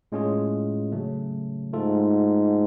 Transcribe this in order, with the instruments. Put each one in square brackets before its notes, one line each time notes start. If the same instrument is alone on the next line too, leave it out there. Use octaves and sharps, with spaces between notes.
[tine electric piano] A2 G#3 C#4 F4 G#4
C#3 F#3 A3
[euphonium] G#2 [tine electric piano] A3 F4 A4